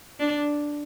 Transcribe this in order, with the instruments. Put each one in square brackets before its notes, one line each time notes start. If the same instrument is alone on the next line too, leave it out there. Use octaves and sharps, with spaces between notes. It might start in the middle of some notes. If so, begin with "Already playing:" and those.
[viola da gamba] D4